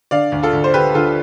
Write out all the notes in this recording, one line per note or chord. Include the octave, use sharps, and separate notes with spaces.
D3 D5 F5
D2
F4 A4
D2
C5
D3 G4 B4
D3 F4 A4